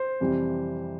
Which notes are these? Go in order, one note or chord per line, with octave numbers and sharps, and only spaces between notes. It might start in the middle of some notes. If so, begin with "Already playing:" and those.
Already playing: C5
F2 C3 E3 G3